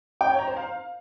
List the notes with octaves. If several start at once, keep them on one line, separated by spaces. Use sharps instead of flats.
G5
C#5
A#5
C5
F5